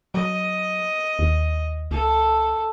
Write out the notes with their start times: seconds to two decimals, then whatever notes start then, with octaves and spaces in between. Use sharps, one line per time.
0.14 F#3 D#5
1.19 D#2
1.91 C#2 A4